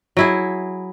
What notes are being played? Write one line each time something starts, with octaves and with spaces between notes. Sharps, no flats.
F#3 E4 G#4